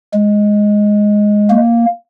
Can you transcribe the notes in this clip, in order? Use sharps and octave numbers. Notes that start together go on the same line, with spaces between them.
G#3
A#3